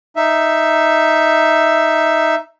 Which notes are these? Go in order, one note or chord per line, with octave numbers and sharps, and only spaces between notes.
D#4 E5